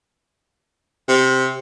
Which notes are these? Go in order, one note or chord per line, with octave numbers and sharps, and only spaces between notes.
C3